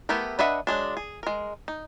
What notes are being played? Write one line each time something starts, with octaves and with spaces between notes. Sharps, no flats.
A3 B3 E4 G4 A#4
D4 B4 D#5 E5 F#5
F#3 G#3 D4
G#4
G#3 A#4
D#4